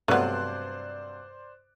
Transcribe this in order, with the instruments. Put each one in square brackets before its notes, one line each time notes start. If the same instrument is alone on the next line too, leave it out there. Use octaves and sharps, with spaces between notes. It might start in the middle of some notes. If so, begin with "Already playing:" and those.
[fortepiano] G2 C3 F#3 [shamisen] A3 B3 [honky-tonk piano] C5 D5 F#6